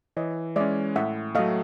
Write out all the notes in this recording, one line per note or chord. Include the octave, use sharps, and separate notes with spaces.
E3 C#5 D#5
G#3 C#4 D5 E5
A2 E5 F#5
F#3 A3 D#5 F5